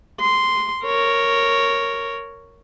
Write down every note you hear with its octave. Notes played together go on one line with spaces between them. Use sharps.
C6
A#4 C#5